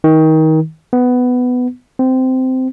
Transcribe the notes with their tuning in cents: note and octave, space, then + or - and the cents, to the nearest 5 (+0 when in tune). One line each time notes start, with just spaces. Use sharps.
D#3 +25
B3 +10
C4 -15